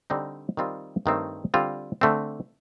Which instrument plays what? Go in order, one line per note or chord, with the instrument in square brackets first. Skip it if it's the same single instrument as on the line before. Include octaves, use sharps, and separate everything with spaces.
[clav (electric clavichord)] D3 G3 C4 D#4
D#3 G3 C4 F4
G2 D#3 A3 C4
D3 G3 C4 F4
D3 A3 C4